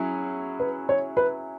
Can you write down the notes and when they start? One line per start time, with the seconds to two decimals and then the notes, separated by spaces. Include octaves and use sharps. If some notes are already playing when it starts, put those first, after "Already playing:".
Already playing: F#3 C#4 E4 G#4
0.60 B4
0.89 C#5
1.17 B4